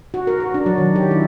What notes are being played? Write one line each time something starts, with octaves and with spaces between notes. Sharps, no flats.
F#4
A#4
F#4
D4
F#3
D#3
G4
E4